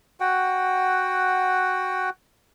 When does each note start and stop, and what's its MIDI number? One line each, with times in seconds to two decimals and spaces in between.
0.20 2.10 66
0.20 2.10 78
0.20 2.10 79